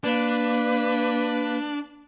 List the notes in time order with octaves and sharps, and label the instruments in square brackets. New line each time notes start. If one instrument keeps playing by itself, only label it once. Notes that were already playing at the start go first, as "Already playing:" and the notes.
[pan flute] A#3 [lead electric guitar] D4 [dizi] B4